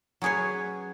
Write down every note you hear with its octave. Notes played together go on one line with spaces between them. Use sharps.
F#3 C#4 G#4 B4 C#5